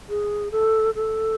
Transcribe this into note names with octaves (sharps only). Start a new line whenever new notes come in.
G#4
A4
A4